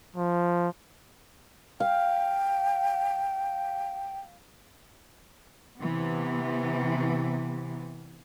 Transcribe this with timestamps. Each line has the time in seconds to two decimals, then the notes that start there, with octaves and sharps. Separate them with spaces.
0.16 F3
1.80 F5 G5
5.79 C3 E3 B3